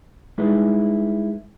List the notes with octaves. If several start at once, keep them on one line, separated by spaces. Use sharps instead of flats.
G3 G#3 D#4 E4 G#4 B4